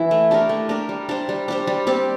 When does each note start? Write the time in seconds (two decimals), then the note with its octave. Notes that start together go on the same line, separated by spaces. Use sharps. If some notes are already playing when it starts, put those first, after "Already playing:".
Already playing: E3 E4
0.11 A3
0.31 D4 G4 A#4
0.49 A3
0.69 D4 G4 A#4
0.89 G3
1.09 D4 G4 C5
1.29 G3
1.48 D4 G4 C5
1.67 G3
1.87 C4 G4 D5